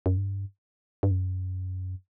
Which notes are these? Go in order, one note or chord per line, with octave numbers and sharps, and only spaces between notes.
F#2
G2
G2
F#2